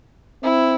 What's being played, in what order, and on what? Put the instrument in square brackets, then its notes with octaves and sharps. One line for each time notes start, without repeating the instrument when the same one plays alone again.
[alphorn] C4 [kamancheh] E4